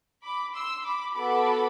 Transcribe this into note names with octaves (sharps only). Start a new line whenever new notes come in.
B5 D6
C6 E6
B5 D6
B3 F#4 A4 B5 D6